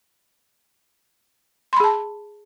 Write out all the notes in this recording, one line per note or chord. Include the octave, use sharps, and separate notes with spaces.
G#4 A5 B5 C6